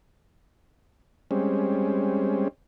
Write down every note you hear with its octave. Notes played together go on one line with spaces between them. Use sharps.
G3 G#3 C4 C#4